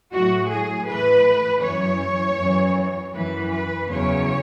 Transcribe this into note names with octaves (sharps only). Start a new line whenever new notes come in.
A2 F#3 F#4
G#4
A2 E3 B4
F#2 E3 C#5
F#2 E3
F#2 E3 B4
B4
E2 C#3 F#3 C#5